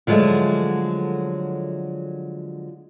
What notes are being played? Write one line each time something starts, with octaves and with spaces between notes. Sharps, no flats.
D3 F3 F#3 G#3 A3